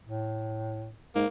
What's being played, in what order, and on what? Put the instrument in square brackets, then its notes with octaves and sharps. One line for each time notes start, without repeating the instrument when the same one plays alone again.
[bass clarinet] A2
[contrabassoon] G#2 [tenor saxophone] A#3